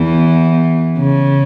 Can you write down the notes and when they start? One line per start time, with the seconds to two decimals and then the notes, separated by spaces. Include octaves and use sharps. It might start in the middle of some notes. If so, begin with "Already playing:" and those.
Already playing: E2 E3
0.98 C#3